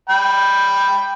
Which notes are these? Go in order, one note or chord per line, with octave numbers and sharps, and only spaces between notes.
G5 B5